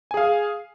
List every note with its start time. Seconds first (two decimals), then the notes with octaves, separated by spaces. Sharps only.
0.11 G#5
0.14 G#4
0.17 F5